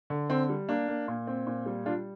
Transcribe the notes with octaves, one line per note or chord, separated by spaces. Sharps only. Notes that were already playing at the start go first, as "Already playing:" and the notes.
D3
D3 C4
G3
A#3 D4
A#3
A#2
C4
A#2
G3
G3 D4 F4